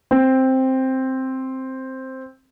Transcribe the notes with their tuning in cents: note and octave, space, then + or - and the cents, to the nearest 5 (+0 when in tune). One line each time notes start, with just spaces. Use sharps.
C4 +5